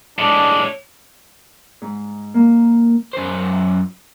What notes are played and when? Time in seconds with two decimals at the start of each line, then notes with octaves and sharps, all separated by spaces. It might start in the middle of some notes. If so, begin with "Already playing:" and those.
0.19 A2 G#3 D4
1.82 G#2
2.34 A#3
3.13 F#2 C5